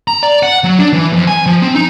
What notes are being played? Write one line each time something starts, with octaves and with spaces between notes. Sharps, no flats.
A#5
D5
F#5
F#3
D4
E3
F2
G#5
F3
C4
D#4